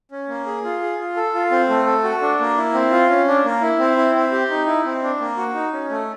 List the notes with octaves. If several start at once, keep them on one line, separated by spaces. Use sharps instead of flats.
C#4
A#3
G#4
F4
G#4
F4
A4
F4
C4
A3
A4
F#4
D4
A#3
E4
C4
F4
C#4
D4
A#3
E4
C4
E4
C4
G4
D#4
E4
C4
D4
A#3
F#4
D#4
C#4
A3